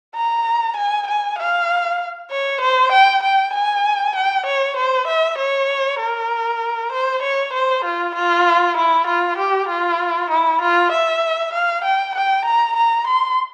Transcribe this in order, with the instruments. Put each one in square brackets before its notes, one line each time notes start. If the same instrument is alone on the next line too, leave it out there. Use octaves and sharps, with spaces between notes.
[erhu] A#5
G#5
G#5
F5
C#5
C5
G5
G5
G#5
G5
C#5
C5
E5
C#5
A#4
C5
C#5
C5
F4
F4
E4
F4
G4
F4
E4
F4
E5
F5
G5
G5
A#5
A#5
C6